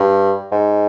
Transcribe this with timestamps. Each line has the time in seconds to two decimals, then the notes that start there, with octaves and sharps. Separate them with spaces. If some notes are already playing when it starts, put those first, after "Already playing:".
Already playing: G2
0.51 G#2